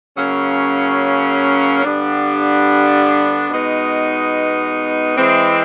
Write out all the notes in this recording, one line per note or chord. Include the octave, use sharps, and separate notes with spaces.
C#3 F#3 A#3 C#4
G2 D3 G3 B3 D4
B2 G#3 B3 D#4
E3 G#3 C4